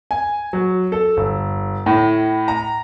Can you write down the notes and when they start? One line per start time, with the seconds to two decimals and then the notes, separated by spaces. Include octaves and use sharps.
0.11 G#5
0.53 F#3
0.92 A4
1.17 G1
1.86 A2
2.48 A#5